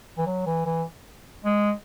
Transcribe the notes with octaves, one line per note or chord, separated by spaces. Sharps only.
E3
F#3
E3
E3
G#3